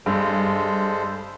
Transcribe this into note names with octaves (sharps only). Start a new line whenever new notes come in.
G2 G#3 A4 C5